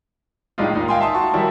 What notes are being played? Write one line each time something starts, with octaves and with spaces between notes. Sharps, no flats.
A2 G3 G#3 D4 D#4 F4
D#2 D#4
F5 G5 G#5 C6
E5 A5 C6 D#6
F#4 A5 C#6
D#3 F#3 G3 E4